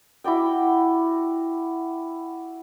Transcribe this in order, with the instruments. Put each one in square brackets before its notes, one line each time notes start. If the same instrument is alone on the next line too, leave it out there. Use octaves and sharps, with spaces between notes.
[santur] E4 F#4 D5 G5